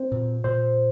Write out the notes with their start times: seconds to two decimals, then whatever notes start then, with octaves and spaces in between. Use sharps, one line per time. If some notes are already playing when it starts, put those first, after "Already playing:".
Already playing: C4 C5
0.12 A#2
0.44 A#2 C5